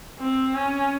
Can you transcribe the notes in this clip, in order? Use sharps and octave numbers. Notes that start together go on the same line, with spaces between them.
C4
C#4